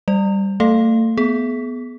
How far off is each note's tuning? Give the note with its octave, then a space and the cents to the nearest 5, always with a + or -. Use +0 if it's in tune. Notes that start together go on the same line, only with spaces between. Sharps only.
G3 +0 D5 +25
A3 +45 A4 +0 F5 +0
B3 +0 G#4 +35